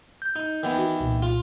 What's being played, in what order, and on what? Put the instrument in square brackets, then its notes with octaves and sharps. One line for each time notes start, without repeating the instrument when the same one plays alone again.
[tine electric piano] G6
[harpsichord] D#4
D#3 E3 B3
[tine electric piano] F#4
C2 A#2
[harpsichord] F4